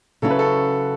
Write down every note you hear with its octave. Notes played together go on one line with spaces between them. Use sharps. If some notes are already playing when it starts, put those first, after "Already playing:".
C#3 F#3 C#4 E4 A4
B4
A4